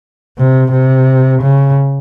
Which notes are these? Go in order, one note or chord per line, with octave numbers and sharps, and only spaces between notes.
C3
C3
C#3